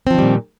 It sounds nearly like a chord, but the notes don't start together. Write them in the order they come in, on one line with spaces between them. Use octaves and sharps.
C4 F3 D#3 G3 A#2